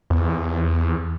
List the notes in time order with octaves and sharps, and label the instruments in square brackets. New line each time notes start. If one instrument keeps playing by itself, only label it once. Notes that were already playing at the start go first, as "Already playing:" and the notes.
[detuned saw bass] E2